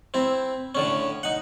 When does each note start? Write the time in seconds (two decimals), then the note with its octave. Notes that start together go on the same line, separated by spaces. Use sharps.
0.14 C4 E4
0.75 A2 D3 C#4
1.23 D#4 F#5